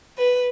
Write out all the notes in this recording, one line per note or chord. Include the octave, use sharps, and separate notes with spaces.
B4